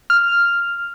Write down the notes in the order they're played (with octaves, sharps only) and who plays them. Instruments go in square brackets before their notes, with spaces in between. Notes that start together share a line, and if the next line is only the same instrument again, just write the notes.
[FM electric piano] F6